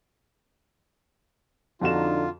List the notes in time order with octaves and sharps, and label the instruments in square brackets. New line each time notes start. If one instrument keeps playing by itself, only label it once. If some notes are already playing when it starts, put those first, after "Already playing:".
[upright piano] F2 F#4 E7 [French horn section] D3 D#4 [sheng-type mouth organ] F4